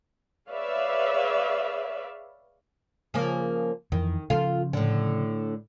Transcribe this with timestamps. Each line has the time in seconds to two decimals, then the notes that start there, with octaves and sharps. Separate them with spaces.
0.50 G#4 B4 C#5 D5 E5 F5
3.14 C#3 F3 A#3
3.92 F2 D#3 E3
4.30 C#3 F3 F4 A4 F5
4.73 A2 D3